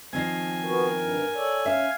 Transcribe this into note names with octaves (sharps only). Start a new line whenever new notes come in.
D#3 F3 C4 G#5
B3 F#4 A#4
G2
A4 C#5 D5
C#4 E5 F5